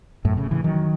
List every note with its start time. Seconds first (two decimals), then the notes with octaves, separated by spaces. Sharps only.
0.25 F#2 A2
0.37 A2 C#3
0.51 C#3 E3
0.64 D#3 F#3